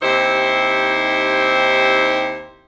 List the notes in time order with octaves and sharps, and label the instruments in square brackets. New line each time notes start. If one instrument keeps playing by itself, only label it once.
[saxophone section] D#2 C4 D#4 E4 G4 C5